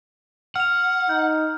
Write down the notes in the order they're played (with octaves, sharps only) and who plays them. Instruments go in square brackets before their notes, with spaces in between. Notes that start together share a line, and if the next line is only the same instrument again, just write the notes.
[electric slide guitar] F#5 [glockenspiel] F6 F7
[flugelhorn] D#4 [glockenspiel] G6